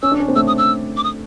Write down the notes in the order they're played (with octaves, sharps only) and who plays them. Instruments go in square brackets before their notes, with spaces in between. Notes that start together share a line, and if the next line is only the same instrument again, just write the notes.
[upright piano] C#4 [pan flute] E6
[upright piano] D4
C#4
C4
[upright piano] A3 [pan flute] E6
[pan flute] D#6
E6
D6
D#6